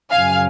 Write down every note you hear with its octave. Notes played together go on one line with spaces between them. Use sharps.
F#2 C#3 F3 F5 G#5